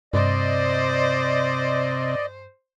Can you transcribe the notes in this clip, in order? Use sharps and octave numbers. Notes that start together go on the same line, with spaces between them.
G2 C3 C5 D5 D#5